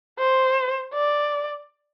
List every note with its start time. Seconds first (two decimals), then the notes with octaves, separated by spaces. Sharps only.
0.19 C5
0.94 D5